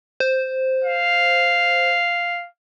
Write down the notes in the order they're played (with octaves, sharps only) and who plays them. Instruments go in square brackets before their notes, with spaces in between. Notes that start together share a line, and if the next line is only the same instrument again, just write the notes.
[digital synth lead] C5
[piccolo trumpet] F5